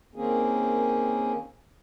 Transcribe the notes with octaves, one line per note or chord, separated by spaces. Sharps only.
D#3 A#3 C4 C#4 G#4